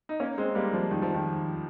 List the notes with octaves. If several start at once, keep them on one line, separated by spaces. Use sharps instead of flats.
D#4
A#3 C#4
G#3 C4
G3 A#3
F3
D#3
F3
D#3